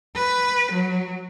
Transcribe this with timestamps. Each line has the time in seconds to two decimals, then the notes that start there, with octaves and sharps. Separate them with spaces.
0.16 B4
0.72 F#3